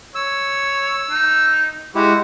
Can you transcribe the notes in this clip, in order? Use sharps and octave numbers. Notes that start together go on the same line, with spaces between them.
C#5 E6
D#4
G#3 E4 F#4 G4